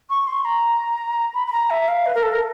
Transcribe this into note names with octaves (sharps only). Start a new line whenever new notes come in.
C#6
C6
A#5
B5
B5
A#5
E5
F5
B4
A#4
A4
A#4